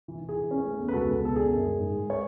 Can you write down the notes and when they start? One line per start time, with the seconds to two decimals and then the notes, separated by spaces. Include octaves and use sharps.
0.08 E3
0.21 E3
0.29 G#4
0.37 E3
0.51 C#4
0.65 A3
0.78 E2
0.88 B4
0.93 C#2 F#4 A4
1.08 C#2
1.22 B2 A4
1.35 D3 G#4
1.50 F#2
1.65 G#3
1.79 G#2
1.92 G#3
2.10 C#5